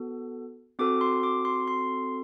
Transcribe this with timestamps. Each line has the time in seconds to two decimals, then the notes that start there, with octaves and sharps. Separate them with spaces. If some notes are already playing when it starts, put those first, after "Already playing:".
Already playing: B3 F#4 A4
0.79 C4 F#4 A4 D6
1.01 C6
1.23 D6
1.45 C6
1.68 C6